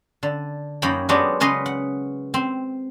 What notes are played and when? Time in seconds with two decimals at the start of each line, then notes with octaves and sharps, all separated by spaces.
0.23 D3
0.82 F#2 A#3 D#4 C#5 G5 B5
1.09 F#3 G#3 B3 C#4 D4 G4
1.40 C#3 C#4 B4 D#5 C6
1.66 F#5
2.34 C4